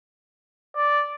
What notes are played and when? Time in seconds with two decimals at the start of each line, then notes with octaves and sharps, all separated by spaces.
0.75 D5